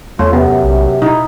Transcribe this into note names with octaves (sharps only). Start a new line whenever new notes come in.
E2 A3 C#4 F4
F#2 C3 B3
B1
B2 D#4 E4